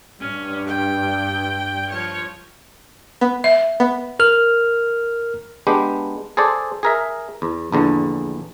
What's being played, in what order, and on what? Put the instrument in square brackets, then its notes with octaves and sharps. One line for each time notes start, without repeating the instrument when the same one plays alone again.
[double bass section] G2 [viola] C#4
[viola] G5
F3 C#5
[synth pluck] B3
[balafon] E5
[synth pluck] B3
[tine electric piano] A#4 F6
[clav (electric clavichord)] G#3 B3 D4 G4
G#4 A4 C5 D5
G#4 A#4 E5
E2
A#1 E2 D3